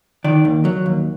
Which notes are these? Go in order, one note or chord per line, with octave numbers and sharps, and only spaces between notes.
D#3 D5
D#2
F#3
D#2